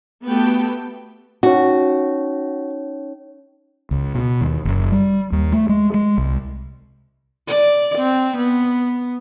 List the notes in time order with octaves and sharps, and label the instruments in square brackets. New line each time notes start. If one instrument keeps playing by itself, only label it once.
[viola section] A3 B3 F#4 G4 G5 A5
[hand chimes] C#4 D#4 C#5 [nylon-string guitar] F#4
[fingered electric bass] C#2
B2
D#2
F#1
G3
D#2
A3
G#3
G#3
C2
[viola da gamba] D5
C4
B3